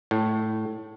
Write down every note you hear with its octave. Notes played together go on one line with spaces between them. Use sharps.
A2